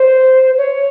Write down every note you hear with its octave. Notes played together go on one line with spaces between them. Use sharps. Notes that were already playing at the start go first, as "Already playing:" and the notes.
Already playing: C5
C#5